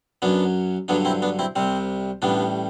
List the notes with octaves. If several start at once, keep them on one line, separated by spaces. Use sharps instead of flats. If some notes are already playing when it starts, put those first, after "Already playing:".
F#2 F#3 B3 D4
G2 D3 F#3 B3 D4
C4 E4
B3 D4
C4 E4
C2 C3 G3 C4
A1 A2 G3 B3 D4